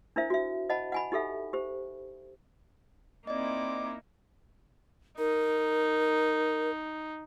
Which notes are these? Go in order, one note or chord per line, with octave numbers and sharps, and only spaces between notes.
D4 E4 A#4 C5 E5
F#4 E5
C5 D#5 F#5 A5 B5
F#5 G#5 B5
D#4 G4 A4 E5
G4 C5
A#3 C4 D#4 E4 D5 D#5 D6
D#4 A#4